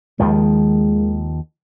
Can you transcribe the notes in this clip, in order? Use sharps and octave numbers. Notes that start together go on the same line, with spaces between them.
D#2 D#3 F3 G#3